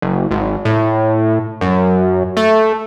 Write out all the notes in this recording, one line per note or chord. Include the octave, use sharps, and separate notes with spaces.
F#1
G#1
A2
F#2
A3